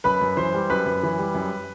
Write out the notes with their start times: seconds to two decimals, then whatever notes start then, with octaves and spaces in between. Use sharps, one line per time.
0.04 F#2 B4 B5
0.21 F#2
0.37 E3 C5 C6
0.54 G3
0.70 F#2 B4 B5
0.86 F#2
1.03 E3
1.19 G3
1.35 F#2